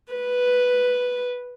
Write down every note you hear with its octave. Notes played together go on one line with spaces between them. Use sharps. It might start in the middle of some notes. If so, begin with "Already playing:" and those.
B4